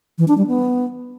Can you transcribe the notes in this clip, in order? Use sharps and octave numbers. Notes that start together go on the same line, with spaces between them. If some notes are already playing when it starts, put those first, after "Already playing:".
E3
D4
G3
B3